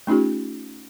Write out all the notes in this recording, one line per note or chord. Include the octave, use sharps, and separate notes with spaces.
A3 C#4 D#4 F4 G4